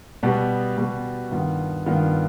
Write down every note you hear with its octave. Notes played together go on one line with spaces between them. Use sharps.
B2 G3 B3
B2 G3 B3
G2 D#3 B3 F4
G2 D#3 B3 F4